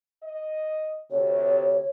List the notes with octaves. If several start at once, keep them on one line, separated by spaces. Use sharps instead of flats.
D#5
D2 C3 C#5